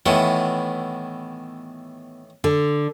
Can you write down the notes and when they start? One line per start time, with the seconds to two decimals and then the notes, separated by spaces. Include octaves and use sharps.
0.06 A2 D#3 E3 B3
2.44 D3